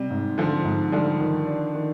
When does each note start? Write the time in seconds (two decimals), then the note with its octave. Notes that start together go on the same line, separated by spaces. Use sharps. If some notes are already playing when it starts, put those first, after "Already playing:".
Already playing: C3 G3
0.10 G#2
0.38 D3 F3 C4
0.65 G#2
0.92 D3 F3 G3
1.20 D#3
1.47 D4
1.75 D#3